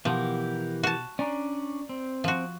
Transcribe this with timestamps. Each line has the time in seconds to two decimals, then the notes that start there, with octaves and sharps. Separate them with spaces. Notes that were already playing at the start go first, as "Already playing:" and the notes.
0.05 B2 E3 F3 G4 A#4 F#5
0.83 F#4 A5
1.19 C#4 D4 D5 G#5 A#5
1.89 C4
2.24 F3 F#4